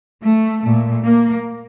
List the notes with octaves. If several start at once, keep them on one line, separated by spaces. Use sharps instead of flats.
A3
A#2 A3
A#3